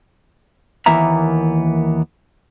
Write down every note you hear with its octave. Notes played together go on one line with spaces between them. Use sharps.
D#2 E3 A#3 B3 E5 A#5